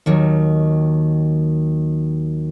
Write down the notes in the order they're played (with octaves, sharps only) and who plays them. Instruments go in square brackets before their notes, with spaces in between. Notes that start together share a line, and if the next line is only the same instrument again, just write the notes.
[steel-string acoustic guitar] D#2 D#3 F#3